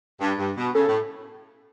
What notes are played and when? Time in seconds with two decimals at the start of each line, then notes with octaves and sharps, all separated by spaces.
0.20 G2
0.38 G2
0.57 B2
0.74 C#3 A4
0.88 A2